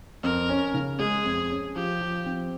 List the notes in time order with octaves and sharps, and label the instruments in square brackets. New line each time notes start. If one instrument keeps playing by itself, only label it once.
[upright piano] F2 [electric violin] A#4
[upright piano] C#4
C#3
[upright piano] G#3 [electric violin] G#4
[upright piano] F2
C#4
[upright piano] F3 [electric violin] G4
[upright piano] F3
C4